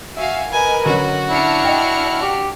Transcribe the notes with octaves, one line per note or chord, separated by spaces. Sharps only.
F#4 E5 F5 G#5
A#4 B4 D#5 G#5
D3 F#3 C#4 F#4
D4 E4 F6 C#7
D#5 G5
G4